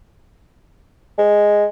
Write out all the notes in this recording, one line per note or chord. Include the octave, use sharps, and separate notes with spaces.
G#3